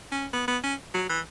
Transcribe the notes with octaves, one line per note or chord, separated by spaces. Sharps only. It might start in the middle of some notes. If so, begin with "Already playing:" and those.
C#4
B3
B3
C#4
F#3
E3